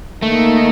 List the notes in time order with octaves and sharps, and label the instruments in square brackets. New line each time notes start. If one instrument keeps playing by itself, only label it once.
[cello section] D#3 A#3 D#4 [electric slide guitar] A3